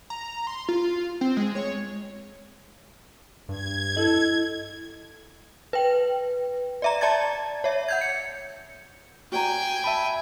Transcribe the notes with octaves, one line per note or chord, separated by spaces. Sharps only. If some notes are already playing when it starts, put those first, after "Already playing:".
A#5
C6
F4
C4
G#3
C#5
G2 G#6
E4 A4 D#5
B4 G5
D5 E5 A#5
D5 A5 G#6 A6
C#5 E5
F#5 G6 G#6
C#7
F#4 D5 G5 G#5 A#5
E5 A5 B5